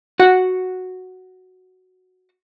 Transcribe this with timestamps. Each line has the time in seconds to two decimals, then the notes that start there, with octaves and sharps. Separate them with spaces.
0.20 F#4 F#5